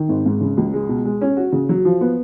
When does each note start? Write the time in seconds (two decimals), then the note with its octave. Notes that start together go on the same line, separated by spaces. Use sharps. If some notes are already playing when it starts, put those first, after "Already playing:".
Already playing: D#3
0.09 G#1
0.26 G#2
0.41 C#3
0.57 C#2
0.73 G#3
0.89 B2
1.05 G#3
1.21 C#4
1.37 F#4
1.52 C#3
1.69 F#3
1.85 F3
2.01 B3